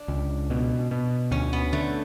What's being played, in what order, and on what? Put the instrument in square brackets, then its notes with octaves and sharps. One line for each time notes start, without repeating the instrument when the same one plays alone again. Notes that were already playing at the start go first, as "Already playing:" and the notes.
Already playing: [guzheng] D4
[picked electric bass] C#2
B2
B2
[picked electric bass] D2 [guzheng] C#4
[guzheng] B3
[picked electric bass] D3 [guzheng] A3